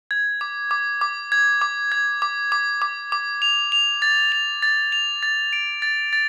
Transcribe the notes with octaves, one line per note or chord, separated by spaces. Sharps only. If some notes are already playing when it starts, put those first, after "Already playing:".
G#6
D6
D6
D6
G#6
D6
G#6
D6
D6
D6
D6
F7
F7
A6
F7
A6
F7
A6
D7
A6
A6